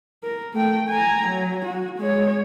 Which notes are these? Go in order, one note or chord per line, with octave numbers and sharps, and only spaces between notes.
A#4
A3 G5
G#5 A#5
F#3
F#4
G#3 C#5